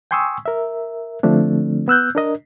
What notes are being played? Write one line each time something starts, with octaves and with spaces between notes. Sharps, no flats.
G5 G#5 C6 C#6 D#6 E6
A#4 E5
D3 F3 A3 C4 D4
B3 E6 F#6 G6
D4 A#4 D#5